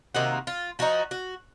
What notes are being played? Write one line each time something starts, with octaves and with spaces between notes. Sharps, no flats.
C3 D#3 A#3 D#4 F#4
F4
F3 C4 D#4 F#4
F#4